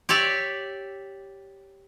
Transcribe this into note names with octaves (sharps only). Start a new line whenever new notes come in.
G4 C#5 D5 E5